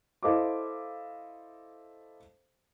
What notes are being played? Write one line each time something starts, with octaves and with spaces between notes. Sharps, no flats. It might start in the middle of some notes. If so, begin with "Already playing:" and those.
E4 A4 C5 D#5 F5 D6